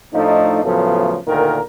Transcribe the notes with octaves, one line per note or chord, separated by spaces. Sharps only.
A2 F3 A3 D4 D#4
A2 C#3 F3 F#3 A3 B3
D2 A#2 D3 D#3 A#4